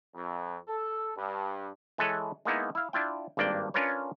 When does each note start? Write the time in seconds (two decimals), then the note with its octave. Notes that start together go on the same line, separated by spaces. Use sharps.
0.14 F2
0.68 A4
1.16 G2
1.98 E3 G#3 A4 B4 C#5
2.45 G#3 A#3 B3 D#4 E4
2.75 E4 F5
2.93 D4 E4 F4 G5
3.37 G#1 G2 A#3 D4 D5 G5
3.74 C#4 D4 F4 A#4 B4 C#5